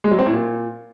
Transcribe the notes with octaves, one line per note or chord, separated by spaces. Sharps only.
G#3
F#3
C4
A2
A#2